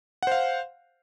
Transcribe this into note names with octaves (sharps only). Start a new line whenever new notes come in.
C5 F5 F#5